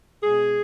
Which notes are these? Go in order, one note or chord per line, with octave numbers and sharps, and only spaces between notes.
B2 G#3 G#4